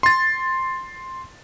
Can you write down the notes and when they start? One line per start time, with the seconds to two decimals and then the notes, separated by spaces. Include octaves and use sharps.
0.03 C6 A6